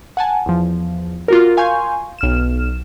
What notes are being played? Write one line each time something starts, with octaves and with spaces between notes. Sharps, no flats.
F#5 G#5 A5
E2 F3
F4 F#4 A#4
F5 G#5 C6 C#6 G6
B1 F6 E7